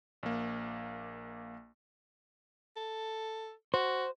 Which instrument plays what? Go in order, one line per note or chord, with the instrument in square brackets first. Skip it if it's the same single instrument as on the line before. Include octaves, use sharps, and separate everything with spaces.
[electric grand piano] A#1 A#3
[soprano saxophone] A4
[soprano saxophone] F#4 [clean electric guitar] C5